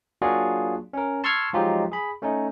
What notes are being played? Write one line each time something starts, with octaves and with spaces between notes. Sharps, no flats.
F#3 A#3 D4 F4 F#4 G#4
C#4 A#4
A5 C6 C#6 E6 F6 G#6
F3 F#3 G#3 D#4 F4 G4
G#4 B5
A3 C#4 D#4